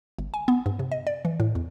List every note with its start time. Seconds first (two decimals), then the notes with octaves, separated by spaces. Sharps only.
0.19 G1
0.34 G#5
0.48 B3
0.66 G2
0.79 C3
0.92 D#5
1.07 D5
1.25 E3
1.40 A2
1.55 E2